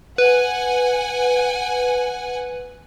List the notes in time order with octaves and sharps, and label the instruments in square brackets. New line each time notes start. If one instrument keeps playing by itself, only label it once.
[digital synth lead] B4 [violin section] F#5 G#5